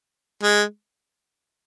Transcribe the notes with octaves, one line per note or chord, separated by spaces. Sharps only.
G#3